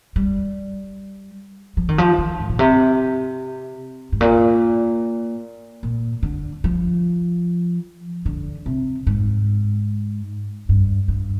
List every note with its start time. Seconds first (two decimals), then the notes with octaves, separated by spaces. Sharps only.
0.16 G3
1.77 F3
1.89 D#3
1.98 F3
2.18 D#3
2.40 G#2
2.49 A#2
2.59 C3
4.12 G#2
4.21 A#2
5.83 A#2
6.23 D3
6.64 F3
8.26 D3
8.66 C3
9.07 G#2
10.69 G2
11.08 G2